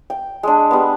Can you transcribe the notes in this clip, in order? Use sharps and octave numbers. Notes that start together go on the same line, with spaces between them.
G5
G#3 D4
G3 B3